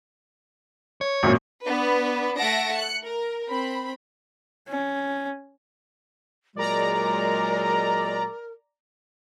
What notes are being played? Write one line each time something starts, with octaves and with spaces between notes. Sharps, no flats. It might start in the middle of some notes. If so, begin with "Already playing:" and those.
C#5
G#1 F#2 A#2
B3 D4 B4
A3 E5 F#5 A5 A#6 D7
F#6 C#7
A#4
C4 B5
C#4
A#2 F#3 G#3 A#4 D5 A#5